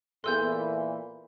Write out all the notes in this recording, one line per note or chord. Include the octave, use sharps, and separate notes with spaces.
A#2 E3 B3 G#4 A4 C6 E6 G6